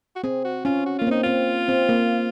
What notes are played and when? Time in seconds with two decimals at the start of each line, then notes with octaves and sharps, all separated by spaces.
0.16 F#4
0.23 C4 G#4
0.44 F#4
0.65 C#4 F4
0.86 F#4
0.98 A#3 F4
1.07 C4 D#4
1.23 C4 F4
1.68 C4
1.89 A#3